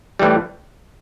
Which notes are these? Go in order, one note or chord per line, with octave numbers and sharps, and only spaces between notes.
A2 E3 G3